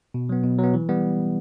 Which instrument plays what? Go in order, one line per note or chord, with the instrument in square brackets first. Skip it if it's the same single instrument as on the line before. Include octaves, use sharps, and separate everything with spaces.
[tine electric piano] B2
F#3 B3
B2
F#3 B3
E3
G3 B3